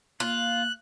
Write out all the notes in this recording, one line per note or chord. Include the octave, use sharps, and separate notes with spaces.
A#3 F4 F#6